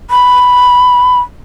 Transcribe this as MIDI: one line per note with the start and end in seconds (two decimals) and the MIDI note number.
0.11 1.20 83